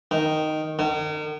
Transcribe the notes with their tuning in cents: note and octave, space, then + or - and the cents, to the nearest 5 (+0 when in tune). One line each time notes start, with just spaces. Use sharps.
D#3 -5
D#3 -40